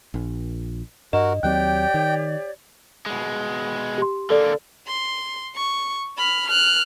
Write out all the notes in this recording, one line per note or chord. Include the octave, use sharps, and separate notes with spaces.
A#1
G2 F#4 A#4 D#5
D#2 F#3 C4 G4 C#5 D5 G5 F#6
D#3
B2 G#3
G4 C6
D3 A#3 A4 D5
C6
C#6
B5 F6
F6 F#6